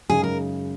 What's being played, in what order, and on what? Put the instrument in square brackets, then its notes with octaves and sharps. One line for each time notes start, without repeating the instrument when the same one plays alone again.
[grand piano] F#2 C#3 G#3 D#4 [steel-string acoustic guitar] G#4
[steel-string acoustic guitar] A#4